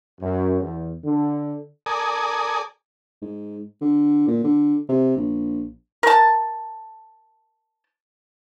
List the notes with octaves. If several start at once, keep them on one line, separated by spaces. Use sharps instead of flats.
F#2
E2
D3
A4 A#4 D5 G#5 D#6
G#2
D3
A#2
D3
C3
A#1
A#4 A5